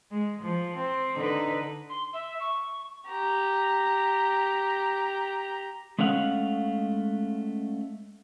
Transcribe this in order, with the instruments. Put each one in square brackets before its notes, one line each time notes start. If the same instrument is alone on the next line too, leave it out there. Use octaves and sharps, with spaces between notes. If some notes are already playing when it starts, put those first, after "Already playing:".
[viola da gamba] G#3
F3
C4
D3 D#4 B4
[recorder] C6
E5
C#6
[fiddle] G4 A#5
[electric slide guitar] G#3 A3 C#4 F5 F#5